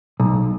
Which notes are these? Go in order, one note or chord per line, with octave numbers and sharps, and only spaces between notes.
B1